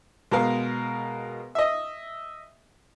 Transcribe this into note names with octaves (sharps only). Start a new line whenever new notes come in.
B2 G#3 A#4 F5
D#5 E5